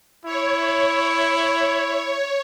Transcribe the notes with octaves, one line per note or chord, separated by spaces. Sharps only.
E4 C#5